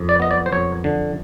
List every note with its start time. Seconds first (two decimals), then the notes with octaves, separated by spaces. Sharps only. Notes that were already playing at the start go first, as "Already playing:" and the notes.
Already playing: F2
0.09 D5
0.20 B3 D#5
0.31 D5
0.46 C5
0.52 F2 C#5
0.84 D3